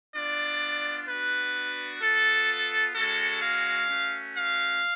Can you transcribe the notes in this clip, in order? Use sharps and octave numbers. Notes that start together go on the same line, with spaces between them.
B3 D4 F4 D5
B3 D4 F#4 B4
B3 F4 A4
G#3 C#4 F#4 A4
F5
A3 C#4 F#4
F5